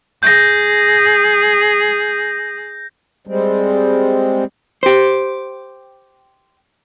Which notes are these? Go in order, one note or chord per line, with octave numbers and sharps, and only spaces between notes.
G#4 G6 A#6
G3 G#3 C4
G4 C5